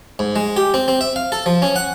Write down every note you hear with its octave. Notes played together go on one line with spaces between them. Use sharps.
G#2
G#3
G4
C4
C4
E5
F5
A4
F3
C#4
F#5